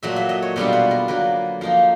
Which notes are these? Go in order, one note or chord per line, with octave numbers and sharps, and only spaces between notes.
A#2 F#3 A3 E5
E5
D#5
C#5
B2 G3 B3 D4 F4 C5
B4
A#4
D3 F#3 A#3 B4
F3 A#3 D#4 F5